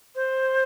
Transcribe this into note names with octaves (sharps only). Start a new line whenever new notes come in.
C5